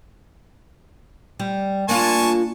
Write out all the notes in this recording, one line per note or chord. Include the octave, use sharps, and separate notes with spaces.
G3
A#3 D4 F4 G#5 A5 C#6